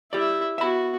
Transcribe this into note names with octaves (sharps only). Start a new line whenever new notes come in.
E4 G4 D5 E5
B3 F#4 E5 B5